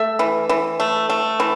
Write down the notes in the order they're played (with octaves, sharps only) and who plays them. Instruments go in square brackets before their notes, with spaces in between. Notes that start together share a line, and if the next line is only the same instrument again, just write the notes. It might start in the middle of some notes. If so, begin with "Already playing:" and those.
Already playing: [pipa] A3 E5
E3
E3
A3
A3
E3